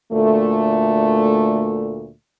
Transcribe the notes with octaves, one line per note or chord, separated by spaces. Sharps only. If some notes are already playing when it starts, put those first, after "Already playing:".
D2 A#2 A3